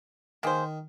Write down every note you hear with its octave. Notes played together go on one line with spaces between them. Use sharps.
D#3 A#3 G#4 C5